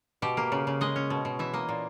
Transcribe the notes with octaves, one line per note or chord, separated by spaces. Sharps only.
B2 G4
A#3
C#3
C#3
G#3 D#5
C#4
B2
B2
E3 E5
A#3 D#5
A#2